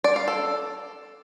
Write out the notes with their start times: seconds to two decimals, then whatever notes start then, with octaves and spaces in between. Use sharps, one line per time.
0.04 D5
0.16 F5
0.28 A4